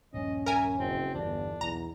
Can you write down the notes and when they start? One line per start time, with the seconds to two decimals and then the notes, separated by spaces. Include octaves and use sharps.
0.14 D#1 A#1 G2 C#4 D#5
0.46 A#4 E5 G#5
0.79 F#1 C4
1.15 G1 E2 D4
1.61 B1 E2 A#5